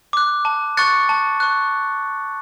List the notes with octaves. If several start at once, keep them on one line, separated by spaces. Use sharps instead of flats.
D6 F#6
A5
C#6 F#6 A6 C#7
A5
C#6 F#6